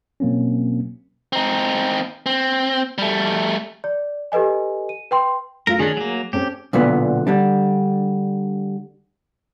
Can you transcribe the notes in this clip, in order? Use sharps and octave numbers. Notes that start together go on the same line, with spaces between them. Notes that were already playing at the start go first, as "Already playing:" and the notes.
B2 F#3 A#3 C4 C#4
C4 D#4
C4
G3 A3
D5
G4 A4 B4 D#5 G#5
D#7
B4 G5 C6
A3 F4 A#4
D#3 C#4 D4 G#4
F#3 A#3
C4 C#4 G4 A4
B1 A#2 D3 B3
D3 G3 D4